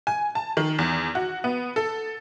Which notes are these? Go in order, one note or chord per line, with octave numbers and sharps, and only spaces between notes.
G#5
A5
D#3
E2
F#4
B3
A4